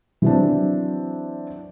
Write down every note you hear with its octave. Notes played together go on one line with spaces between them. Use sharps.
E3 F#3 C4 D4